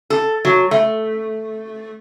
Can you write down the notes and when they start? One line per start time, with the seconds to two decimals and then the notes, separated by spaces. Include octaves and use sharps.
0.10 A4
0.45 F#3
0.71 A3